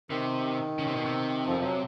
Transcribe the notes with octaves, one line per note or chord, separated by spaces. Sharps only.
C3 D#3
C#3
C3
B2
C3
F2 F3
F#3